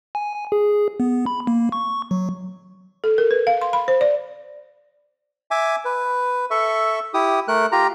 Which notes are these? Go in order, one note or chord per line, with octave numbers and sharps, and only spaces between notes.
G#5
G#5
G#4
B3
B5
A#3
C#6
F#3
A4
A#4
B4
F5
C6
B5
C5
D5
E5 G#5 D6
B4
A4 E5 C#6
E4 G4 D#6
A3 A#4 F#6
F4 G4 A#5